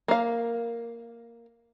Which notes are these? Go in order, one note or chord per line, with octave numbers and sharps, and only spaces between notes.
A#3 F5